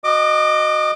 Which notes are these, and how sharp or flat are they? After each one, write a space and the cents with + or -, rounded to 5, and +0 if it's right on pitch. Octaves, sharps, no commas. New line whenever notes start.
F#4 -10 D#5 -15 D6 +25